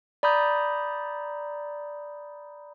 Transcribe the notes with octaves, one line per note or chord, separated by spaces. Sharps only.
D5 A#5 B5 D#6 G6